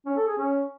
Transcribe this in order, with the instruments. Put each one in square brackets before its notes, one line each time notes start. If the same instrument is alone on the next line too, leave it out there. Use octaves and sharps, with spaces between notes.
[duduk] C#4
A4
G#4
C#4